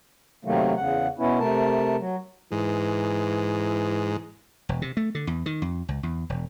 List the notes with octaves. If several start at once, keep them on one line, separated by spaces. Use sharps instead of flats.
C3 D#3 F#3 A3 A#3
E2 C#3 F#5
B2 B3 C#4 E4
C3 A3 A#4 A5
F#3
G#2 E3
E1
C3
A3
D3
E2
D#3
F2
C#2
E2
E1